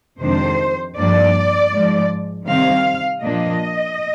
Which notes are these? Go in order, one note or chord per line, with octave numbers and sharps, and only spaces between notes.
F2 C3 D#3 G#3 D4 C5
G2 F3 A#3 D4 D5
G#2 F3 G#3
C3 D#3 G3 C4 F5
A#2 F3 A#3 D4 D#5